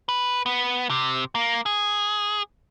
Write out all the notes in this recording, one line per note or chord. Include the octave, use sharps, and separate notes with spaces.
B4
B3
C3
A#3
G#4